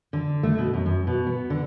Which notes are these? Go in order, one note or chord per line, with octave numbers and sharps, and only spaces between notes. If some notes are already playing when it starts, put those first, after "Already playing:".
D3
A3
B2
F#2
F#2
B2
B3
D3